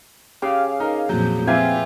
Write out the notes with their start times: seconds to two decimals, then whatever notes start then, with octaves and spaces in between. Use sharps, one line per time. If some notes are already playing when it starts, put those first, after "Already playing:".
0.42 C#3 G4 F5 D6
0.80 D#4 A#4
1.09 F2 A#2 F3 F#3 G6
1.47 C4 F4 G4 B4 E5 F5 G#5